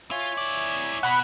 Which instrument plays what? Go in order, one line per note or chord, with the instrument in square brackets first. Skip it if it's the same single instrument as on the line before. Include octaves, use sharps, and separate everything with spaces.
[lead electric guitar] F4 [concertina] C#5 E5 G#5
[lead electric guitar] E4 D5
[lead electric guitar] B2 [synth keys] F#5 B5